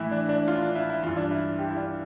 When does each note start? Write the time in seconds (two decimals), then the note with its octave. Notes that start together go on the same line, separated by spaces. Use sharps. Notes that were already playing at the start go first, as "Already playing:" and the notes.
Already playing: A2 E3 E4
0.11 D4
0.29 D4
0.48 F4
0.62 D4
0.75 E4
0.89 E4
1.03 G2 E3 F4
1.17 D4
1.31 E4
1.59 G4
1.70 E4
1.77 D4